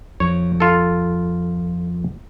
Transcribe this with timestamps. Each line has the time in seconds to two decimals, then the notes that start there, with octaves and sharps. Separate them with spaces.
0.20 F2 C#5
0.60 F4 A4